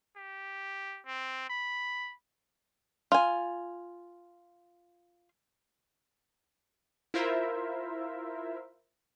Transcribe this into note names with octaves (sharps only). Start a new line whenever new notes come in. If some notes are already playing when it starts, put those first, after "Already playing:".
G4
C4
B5
F4 G#5
E4 F4 A#4 C5 E5